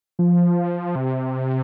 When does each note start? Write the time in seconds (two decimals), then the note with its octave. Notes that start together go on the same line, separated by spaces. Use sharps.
0.19 F3
0.95 C3